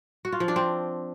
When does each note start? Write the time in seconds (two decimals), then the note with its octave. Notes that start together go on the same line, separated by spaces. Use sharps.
0.25 F#4
0.32 F4
0.40 F3
0.48 D4
0.56 C4